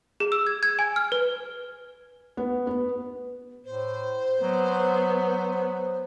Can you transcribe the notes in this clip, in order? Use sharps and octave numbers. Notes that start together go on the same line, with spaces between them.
G#4
E6
G#6
G#6
G#5
F6
B4
B3
B3
A2 C5
F#3 B3